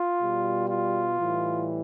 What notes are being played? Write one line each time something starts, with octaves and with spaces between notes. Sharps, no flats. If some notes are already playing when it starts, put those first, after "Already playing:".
Already playing: F4
B2 G3
F4
A2 E3 G3